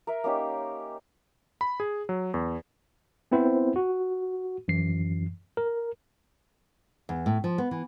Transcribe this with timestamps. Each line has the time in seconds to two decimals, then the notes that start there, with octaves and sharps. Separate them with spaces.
0.07 A#4 E5
0.24 A#3 C#4 D#4 G4
1.61 B5
1.80 G#4
2.09 F#3
2.34 E2
3.31 B3 C4 E4 B4 C5
3.76 F#4
4.68 F#2 E3 C7
5.57 A#4
7.09 E2
7.26 A2
7.44 F3
7.58 B3
7.71 E3